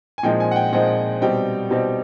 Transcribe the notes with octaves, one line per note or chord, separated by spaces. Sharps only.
G#5
A#2 F3 G#3 C4 D#4 G5
G#5
F#5
G5
A#2 F3 G#3 C4 D#4 F#5
B2 G3 C4 D#4 G5
B2 G3 C4 D#4